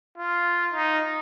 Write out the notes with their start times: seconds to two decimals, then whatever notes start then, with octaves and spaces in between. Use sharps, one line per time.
0.18 F4
0.73 D#4